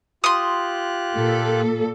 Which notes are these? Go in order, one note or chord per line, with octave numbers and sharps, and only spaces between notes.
F4 G4 C6 D#6 F#6
A#2 A4